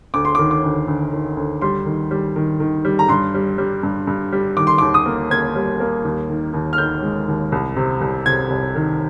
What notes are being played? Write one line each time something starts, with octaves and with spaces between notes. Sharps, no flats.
D2 D6
C6
D#3 D6
D6
D2
D2
D#3
D2
G3 C6
D#3
G3
D#3
D#3
G3
A#5
G2 C6
G3
G3
G2
G2
G3
D#3 D6
C6
D#2 D6
D#6
A#3
A#3 G#6
G3
A#3
D#2
D#3
D#2
F6
D#3 G6
G#3
D#2
C2
C3
C2
C3 G#6
C2
D#3